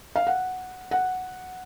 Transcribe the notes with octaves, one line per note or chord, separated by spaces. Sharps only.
F5
F#5
F#5